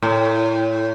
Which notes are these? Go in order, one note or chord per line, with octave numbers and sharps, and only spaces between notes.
A2